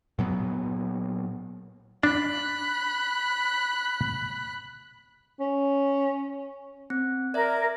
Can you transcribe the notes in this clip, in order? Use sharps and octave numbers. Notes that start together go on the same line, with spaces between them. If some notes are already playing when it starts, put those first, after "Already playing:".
A#2 F#3 B3
D4 B5 F#6
C#4
C4
A#4 D5 E5